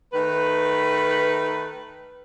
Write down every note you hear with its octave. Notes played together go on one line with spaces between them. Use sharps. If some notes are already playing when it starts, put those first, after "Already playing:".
D#3 A3 B4